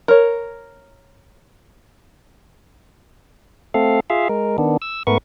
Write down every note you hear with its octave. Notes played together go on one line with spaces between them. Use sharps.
A#4 C#5
A3 C4 A4 F5
F4 G#4 E5 F5
G#3 A#4
D#3 B3 D4
E6
G#2 A3 B3 A#4 B4 C#6